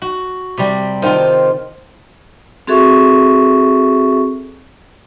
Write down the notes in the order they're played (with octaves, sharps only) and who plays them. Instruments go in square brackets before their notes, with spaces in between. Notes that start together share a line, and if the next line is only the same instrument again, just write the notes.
[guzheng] F#4
C3 G3
[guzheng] D#3 F4 [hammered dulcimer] C5 G5 A5
[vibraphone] C4 F#4 G#4 A4 E5 C#6